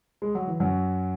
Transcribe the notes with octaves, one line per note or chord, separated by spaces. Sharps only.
G#3
F#3
E3
F#2 F#3